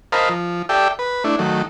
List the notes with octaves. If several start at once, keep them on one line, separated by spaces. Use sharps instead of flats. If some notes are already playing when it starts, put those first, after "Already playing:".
A#4 C5 D#5 F5 A5 B5
F3
G4 A4 D5 E5 G5
B4
A3 D4 E4
D#3 F#3 A3